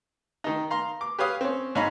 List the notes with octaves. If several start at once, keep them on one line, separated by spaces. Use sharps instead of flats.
D#3 D#4
F5 A#5 C6
D6
G4 B4 C#5 F5 D#6
C4 C#4
G#2 C#5 D#5 F5 A#5 B5